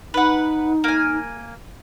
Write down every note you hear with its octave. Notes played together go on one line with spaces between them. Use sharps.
D#4 B4 F#5
A#3 G#5